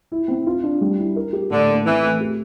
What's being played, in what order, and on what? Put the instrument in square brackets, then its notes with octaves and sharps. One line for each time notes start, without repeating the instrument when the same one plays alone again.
[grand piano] E4
C4
F4
D4
G3
E4
A#4
G4
[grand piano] A2 [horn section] D3
[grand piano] A#3
[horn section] E3 [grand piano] C4
[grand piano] A3
G4